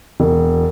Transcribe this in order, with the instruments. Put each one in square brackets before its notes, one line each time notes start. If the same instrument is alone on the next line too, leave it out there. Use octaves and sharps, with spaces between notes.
[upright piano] E1